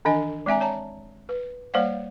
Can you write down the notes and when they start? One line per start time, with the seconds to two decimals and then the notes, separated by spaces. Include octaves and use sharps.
0.05 D#3 E3 D4 D#5 G#5
0.46 G#3 C4 E5 G#5 A#5
0.60 C#5 A5 A#5
1.29 B4
1.74 G3 A#3 C5 D5 F5 F#5